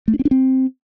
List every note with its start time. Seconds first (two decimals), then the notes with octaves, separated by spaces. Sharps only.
0.08 A3
0.14 D4
0.19 C4
0.25 D4
0.31 C4